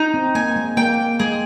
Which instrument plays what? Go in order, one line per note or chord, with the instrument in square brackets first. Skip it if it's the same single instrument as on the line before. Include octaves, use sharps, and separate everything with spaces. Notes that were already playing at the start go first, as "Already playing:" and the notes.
Already playing: [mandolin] D#4
[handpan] C4
[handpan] A#3 [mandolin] G#5
[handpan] G#3
[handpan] A#3 [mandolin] G5
[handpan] G#3 [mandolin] G#4